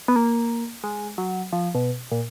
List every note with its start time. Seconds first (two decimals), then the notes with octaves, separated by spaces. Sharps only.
0.08 B3
0.16 A#3
0.84 G#3
1.18 F#3
1.53 F3
1.75 B2
2.12 A#2